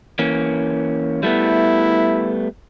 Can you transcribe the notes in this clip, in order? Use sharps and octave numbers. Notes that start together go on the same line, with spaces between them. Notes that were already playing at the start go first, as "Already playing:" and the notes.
E3 A#3 C#4
G3 A3 B3 E4